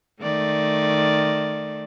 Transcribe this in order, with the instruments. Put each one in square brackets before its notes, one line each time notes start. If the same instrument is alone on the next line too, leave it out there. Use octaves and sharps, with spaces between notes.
[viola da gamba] D#3 A3 D5